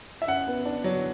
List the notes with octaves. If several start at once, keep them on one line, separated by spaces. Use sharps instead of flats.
E5
F#2 F#5
B3
D4
F#3